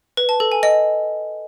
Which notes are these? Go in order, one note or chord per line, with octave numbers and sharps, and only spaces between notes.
B4
A5
A4
G#5
D#5